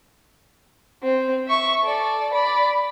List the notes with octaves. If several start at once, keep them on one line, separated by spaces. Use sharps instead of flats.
C4
E5 C#6
A4 D5
D5 B5